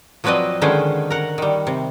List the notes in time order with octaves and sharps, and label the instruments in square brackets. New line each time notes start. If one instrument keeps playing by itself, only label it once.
[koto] F3 F#3 C4 B4 D5 D#5
D3 D#3 G#3 C#4 B4 C5
A#4 F#5
D#3 G3
C3